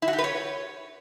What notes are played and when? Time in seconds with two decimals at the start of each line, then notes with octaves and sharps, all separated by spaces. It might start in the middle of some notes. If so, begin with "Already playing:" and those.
0.02 E4
0.08 F#4
0.13 G4
0.18 B4
0.24 C#5